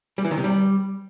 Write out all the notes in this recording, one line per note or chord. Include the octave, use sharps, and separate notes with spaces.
G3
E3
D#3
C3
G3